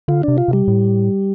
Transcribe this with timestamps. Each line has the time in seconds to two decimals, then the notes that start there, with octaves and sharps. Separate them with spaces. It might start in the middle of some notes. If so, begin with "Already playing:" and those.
0.08 D3 F4
0.23 C3 D4
0.38 F4
0.48 C3 G3
0.68 A2